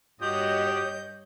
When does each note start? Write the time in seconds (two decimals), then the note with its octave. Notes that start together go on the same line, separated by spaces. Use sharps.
0.22 G2 F#4 G4 C#5 D#5 D#6 G6